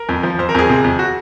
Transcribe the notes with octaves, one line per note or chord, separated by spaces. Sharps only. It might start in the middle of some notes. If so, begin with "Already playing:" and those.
Already playing: A#4
F2
F3
F2 C5
A#4
F2 G#4
C3
F2
F#4